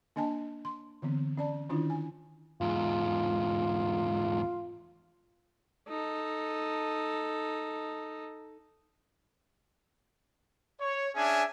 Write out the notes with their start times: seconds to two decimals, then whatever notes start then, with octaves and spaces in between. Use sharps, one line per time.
0.16 A#3 D4 D#5 G#5 A5
0.65 C6
1.02 D3 E3 B3 C4
1.37 C#4 D5 A5
1.69 D#3 C#4 D4 E4 F4
1.90 G#5
2.61 E2 G#2 F4
5.88 D#4 A4
10.80 C#5
11.15 C#4 D4 G#4 E5 G#5